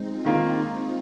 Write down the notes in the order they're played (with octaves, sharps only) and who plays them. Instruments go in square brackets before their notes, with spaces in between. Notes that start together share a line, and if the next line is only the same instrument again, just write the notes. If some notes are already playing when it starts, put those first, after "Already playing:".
Already playing: [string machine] G#3 C4 D#4
F4
[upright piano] D#3 A#3 F4